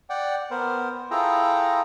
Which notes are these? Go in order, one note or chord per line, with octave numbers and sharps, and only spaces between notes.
D5 F#5 G5
B3 A#4 C5
E4 F4 G#4 A4 G5 A#5